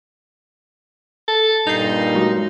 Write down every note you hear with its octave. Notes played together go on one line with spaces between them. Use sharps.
A4
G2 A#2 D#4 G6 C7
F#3 G#3 F#4